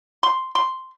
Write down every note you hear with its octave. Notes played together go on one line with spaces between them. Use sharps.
C6
C6